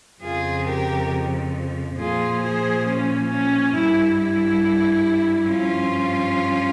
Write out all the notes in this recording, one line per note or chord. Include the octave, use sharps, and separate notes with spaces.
F2 C#3 F3 F4 G#4
G4 A#4
A#2 F3 F4 G#4
G#4 C5
C#4
C#4
G2 G3 E4
E4
G2 F3 C#4 F4